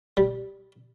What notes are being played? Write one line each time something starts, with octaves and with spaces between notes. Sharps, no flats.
G3